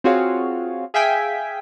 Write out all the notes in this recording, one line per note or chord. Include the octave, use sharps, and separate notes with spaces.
C4 F4 F#4 G#4 C#5 F5
G#4 E5 F5 G5 G#5 B6